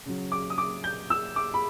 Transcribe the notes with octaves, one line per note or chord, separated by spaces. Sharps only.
C#3 F#3
D6
D#6
D6
G6
E6
D6
B5